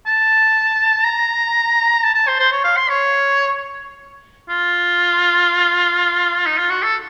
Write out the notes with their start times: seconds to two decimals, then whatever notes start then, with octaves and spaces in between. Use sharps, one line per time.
0.06 A5
1.04 A#5
2.03 A5
2.14 A5
2.27 C5
2.39 C5
2.52 C#5
2.64 F5
2.76 C6
2.89 C#5
4.49 F4
6.46 D#4
6.57 F4
6.70 F#4
6.83 A4